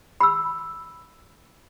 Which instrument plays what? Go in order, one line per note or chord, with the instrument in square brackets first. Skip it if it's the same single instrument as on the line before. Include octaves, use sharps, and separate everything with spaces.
[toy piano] B5 E6